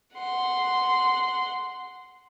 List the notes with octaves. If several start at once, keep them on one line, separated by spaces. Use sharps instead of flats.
F#5 C6